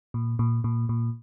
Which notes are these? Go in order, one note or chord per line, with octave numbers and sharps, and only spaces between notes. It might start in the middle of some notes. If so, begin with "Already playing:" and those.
A#2
A#2
A#2
A#2